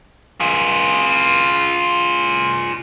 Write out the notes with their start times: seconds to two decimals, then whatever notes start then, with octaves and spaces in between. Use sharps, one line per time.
0.40 F4 G#4